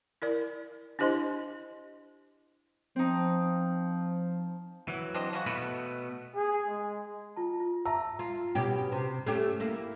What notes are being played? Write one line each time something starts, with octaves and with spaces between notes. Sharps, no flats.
E4 A#4 D5
D4 E4 G4 C5 D#5 C6
F3 C4 D#4
E3 F#3
C4 D4 D#5
C#3 F#4
B2 A3 B3 B5
G#4
G#3
F4 A5
F4
E5 A5 A#5 E6
F4
B2 C#4 G4
C3
A3 C#4 G4
A#3 E4